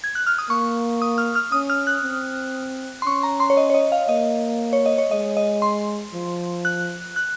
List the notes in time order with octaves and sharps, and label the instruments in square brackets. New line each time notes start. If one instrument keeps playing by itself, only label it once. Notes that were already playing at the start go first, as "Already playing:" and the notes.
[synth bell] G#6
F#6
F6
D#6
[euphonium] A#3 [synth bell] C#6
[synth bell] D#6
F6
F6
[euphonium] C#4 [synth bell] D#6
[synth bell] F6
F#6
[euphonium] C4
[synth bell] C6
[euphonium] C#4 [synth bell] C#6
[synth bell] A#5
C6
C#5
D#5
C#5
D#5
F5
[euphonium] A#3 [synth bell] D#5
[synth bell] C#5
D#5
C#5
[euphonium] G#3 [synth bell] D#5
[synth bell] D#5
C6
[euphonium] F3
[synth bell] F#6
F#6